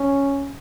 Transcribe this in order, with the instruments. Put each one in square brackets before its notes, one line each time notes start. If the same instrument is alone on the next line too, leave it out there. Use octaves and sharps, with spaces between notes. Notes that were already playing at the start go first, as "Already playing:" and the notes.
Already playing: [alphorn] C#4